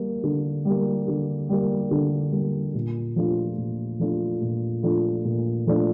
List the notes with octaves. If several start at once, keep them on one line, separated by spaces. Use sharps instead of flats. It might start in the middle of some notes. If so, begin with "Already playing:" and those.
Already playing: G3 A#3
D3
G3
A#3
D3
G3 A#3
D3
G3 A#3
A#2
F3 A3 D4 F4
A#2
F3 A3 D4 F4
A#2
F3 A3 D4 F4
A#2
F3 A3 D4 F4